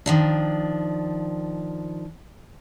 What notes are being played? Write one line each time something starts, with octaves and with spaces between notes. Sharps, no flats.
D#3 F3 D4